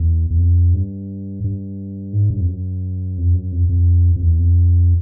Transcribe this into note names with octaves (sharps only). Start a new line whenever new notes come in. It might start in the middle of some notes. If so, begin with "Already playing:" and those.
Already playing: E2
E2
F2
G2
G2
G#2
G2
F2
F#2
F2
F#2
F2
F2
F2
E2
F2